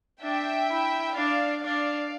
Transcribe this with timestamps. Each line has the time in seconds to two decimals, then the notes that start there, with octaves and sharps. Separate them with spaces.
0.22 D4 E5 G5
0.70 E4
1.16 D4 D5 F5
1.63 D4 D5 F5